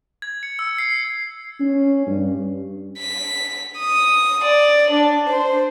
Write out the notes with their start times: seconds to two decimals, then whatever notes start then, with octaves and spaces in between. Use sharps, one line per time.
0.22 G#6
0.43 C#7
0.59 E6
0.78 C7
1.60 C#4
2.07 G2
2.99 B6
3.79 D#6
4.45 D5
4.90 D4
5.29 C5